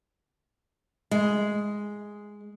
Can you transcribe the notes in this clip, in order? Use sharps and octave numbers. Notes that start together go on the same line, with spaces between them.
G#3